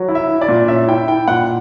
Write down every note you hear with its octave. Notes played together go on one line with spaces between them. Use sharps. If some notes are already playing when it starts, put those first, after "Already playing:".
Already playing: F#3
E4
E5
E4
D5
A#2
C#4 E5
E4 G5
E4 G5
A#2 F#5